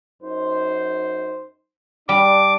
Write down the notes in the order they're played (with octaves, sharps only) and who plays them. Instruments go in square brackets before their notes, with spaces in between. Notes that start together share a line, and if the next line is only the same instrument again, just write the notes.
[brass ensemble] F#2 D#4 C5
[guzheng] G3 [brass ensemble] D4 [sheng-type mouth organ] D6